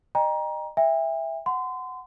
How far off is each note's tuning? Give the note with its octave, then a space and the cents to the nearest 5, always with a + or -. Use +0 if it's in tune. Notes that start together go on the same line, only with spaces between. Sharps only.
D#5 -30 G5 +30 A#5 +20
E5 +0 G5 +45
F#5 +0 C6 -30